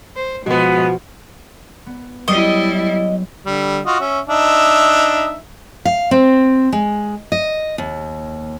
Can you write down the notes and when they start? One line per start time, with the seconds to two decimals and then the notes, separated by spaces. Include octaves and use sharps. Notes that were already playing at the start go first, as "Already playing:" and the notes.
0.16 C5
0.46 B2 F3 G#3 B3 F#4
1.86 B3
2.28 F#3 G3 E4 D#5
3.46 D3 G3
3.86 F4 F#4 D#5
4.00 C#4 E5
4.28 D4 D#4 E5
5.85 F5
6.11 C4
6.73 G#3
7.32 D#5
7.78 D#2